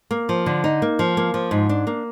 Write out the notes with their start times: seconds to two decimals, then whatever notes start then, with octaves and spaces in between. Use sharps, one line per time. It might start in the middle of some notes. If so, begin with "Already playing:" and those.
0.11 A#3
0.29 F3
0.46 D3
0.64 D#4
0.82 A#3
0.99 F3
1.17 A#3
1.34 F3
1.51 G#2
1.69 D4
1.87 A#3